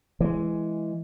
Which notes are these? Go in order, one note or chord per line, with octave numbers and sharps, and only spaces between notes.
E3 G#3